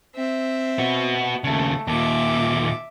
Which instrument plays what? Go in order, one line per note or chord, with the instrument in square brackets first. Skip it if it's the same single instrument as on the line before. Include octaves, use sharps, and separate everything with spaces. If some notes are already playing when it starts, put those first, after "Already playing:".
[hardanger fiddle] C4 E5
[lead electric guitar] B3 F#4
[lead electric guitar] D#2 C#3 [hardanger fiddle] A3
[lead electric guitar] D#2 A#2 [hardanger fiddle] E5 D6